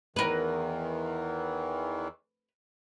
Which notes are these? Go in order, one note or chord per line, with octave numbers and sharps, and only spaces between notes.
E2 D#3 E3 A#4 B4